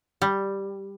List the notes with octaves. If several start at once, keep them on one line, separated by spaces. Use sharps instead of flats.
G3